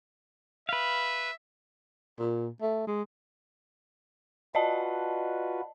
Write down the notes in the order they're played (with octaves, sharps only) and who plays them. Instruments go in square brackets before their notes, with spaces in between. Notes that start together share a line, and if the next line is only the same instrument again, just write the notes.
[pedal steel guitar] B4 F5 [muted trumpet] E5
[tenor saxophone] A#2
A3
G#3
[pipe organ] F4 F#4 B4 [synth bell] D5 D#5 A5